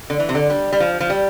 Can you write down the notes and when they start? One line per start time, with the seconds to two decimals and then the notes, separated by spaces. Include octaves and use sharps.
0.10 D3
0.20 E3
0.29 C3
0.35 D3
0.50 G3
0.73 G3
0.80 F3
1.01 F3
1.10 G3